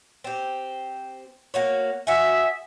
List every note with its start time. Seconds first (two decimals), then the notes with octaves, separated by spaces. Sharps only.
0.24 C4 G4
1.54 A#3 F#4 C#5
2.07 F#4 G#4 E5